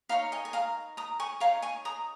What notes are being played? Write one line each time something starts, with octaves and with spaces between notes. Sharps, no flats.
D#4 A#4 C#5 F5 A#5
D#5 G#5
G#5
F5 A#5
A#5 D#6
G#5 C#6
D#4 C#5 F5 A#5
G#5 C#6
A#5 D#6